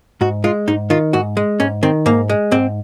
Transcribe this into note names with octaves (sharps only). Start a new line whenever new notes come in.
G#2 F#4
G#3 F4
G#2 D#4
D#3 F4
G#2 F#4
G#3
G#2 C#4
D#3 C4
G#2 A#3
G#3
G#2 C4